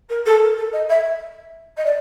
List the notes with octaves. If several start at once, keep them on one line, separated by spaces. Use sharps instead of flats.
A#4
A4
A#4
A4
D#5
E5
D#5
D5